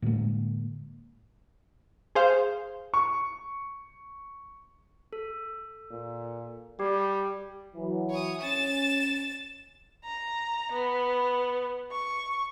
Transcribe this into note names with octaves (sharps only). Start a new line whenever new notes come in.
A2 D3 G#3 A#3
G#4 C5 F5
C#6
A4
A#2
G3 G4
E3 F#3
C#5 D#6
C#4 A6 E7
A#5
B3
C#6